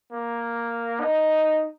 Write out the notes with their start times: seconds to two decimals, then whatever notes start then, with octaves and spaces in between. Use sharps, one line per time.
0.12 A#3
1.01 D#4